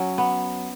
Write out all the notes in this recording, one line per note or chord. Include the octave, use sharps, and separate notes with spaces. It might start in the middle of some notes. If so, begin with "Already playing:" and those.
Already playing: F#3 C#4
B3